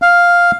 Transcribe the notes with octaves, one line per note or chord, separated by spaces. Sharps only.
F5